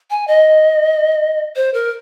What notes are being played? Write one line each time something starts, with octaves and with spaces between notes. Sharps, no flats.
G#5
D#5
C5
A#4